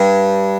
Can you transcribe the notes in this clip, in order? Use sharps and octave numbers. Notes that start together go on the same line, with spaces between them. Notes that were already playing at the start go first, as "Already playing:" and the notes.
Already playing: G2